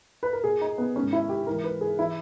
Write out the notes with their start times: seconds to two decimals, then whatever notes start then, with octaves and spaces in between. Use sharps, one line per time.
0.23 B4
0.33 A#4
0.43 A#2 G#4
0.61 D#4
0.78 B3
0.96 G#2 D#3 C#4
1.13 E4
1.29 G4
1.47 G#2 E3 A#4
1.64 B4
1.81 G#4
1.99 E3 E4